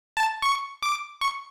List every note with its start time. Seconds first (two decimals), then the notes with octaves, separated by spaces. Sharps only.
0.17 A5
0.42 C#6
0.83 D6
1.21 C#6